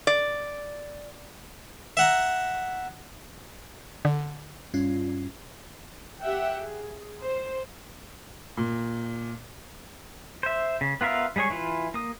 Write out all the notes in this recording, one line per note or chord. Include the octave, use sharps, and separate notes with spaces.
D5
E5 F#5 A#5
D3
G2 C#4 F4
G4 E5 F#5 G5
G#4
C5
A#2
C5 E5
C#3
B3 F4 A#4 E5 F5
G3 G#3 G#4 C#5 C#6
E3 E4 F4
A#3 D#6